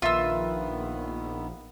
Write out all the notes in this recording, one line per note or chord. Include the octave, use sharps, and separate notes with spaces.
A#1 D#3 B3 F4 E5 E6